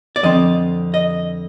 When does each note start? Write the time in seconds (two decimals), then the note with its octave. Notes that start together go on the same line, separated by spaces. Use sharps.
0.16 D5
0.23 F2 D3 F3 C4 D#5
0.94 D#5